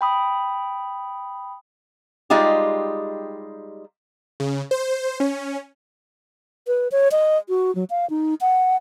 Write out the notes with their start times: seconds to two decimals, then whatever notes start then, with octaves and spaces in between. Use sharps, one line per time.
0.01 G5 B5 D#6
2.30 G3 G#3 D#4 F4 G4
4.40 C#3
4.71 C5
5.20 C#4
6.67 B4
6.92 C#5
7.12 D#5
7.49 F#4
7.75 F#3
7.90 F5
8.10 D#4
8.41 F#5